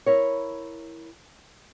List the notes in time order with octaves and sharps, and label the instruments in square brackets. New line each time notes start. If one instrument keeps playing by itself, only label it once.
[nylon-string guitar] E4 A#4 C#5